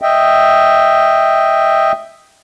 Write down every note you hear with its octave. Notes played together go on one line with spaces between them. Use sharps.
D#5 E5 G5